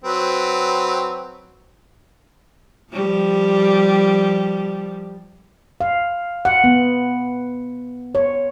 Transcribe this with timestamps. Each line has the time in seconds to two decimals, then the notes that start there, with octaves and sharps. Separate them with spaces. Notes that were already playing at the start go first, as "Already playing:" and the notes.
0.04 F#3 C4 B4
2.93 F3 G3
5.81 F5
6.45 F#5
6.64 B3
8.15 C#5